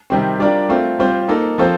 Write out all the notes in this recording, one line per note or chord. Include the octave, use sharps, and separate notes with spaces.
C3 D#3 G3 C4
G3 D4 F4 A#4 D5
A3 C4 F4
G3 C4 F4 C5
A#3 D#4 A4
F3 C4 F4 A4 C5